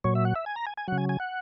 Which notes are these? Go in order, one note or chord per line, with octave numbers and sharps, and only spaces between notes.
A#2 F#3 C#5
E5
F#5
E5
G#5
A#5
G#5
G#5
C#3 F#3 F#5
G#5
G#5
F#5